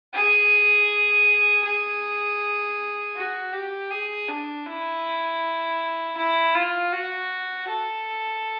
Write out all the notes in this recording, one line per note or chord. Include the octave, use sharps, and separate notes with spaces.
G#4
G#4
F#4
G4
G#4
D4
E4
E4
F4
F#4
A4